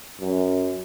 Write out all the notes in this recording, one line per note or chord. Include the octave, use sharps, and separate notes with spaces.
F#2